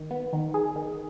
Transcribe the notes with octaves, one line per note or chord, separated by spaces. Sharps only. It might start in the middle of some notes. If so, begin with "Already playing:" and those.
Already playing: D#3
B3
D#3
G#4
D#3